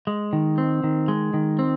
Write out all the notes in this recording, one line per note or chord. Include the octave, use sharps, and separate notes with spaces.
G#3
D#3
C4
D#3
G#3
D#3
C4